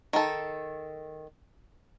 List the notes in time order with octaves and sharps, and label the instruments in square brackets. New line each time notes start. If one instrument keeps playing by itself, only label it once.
[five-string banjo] D#3 A4